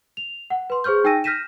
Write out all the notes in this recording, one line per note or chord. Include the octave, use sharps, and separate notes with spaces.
F7
F#5
B4 C6
G#4 C5 C#6 F6 G6
D#4 G5 G#5 E6 A#6 D#7
F6 G6 A#6 B6 D#7 E7